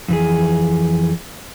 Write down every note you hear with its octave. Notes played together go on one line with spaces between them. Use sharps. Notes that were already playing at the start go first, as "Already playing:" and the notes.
F2 E3 G#4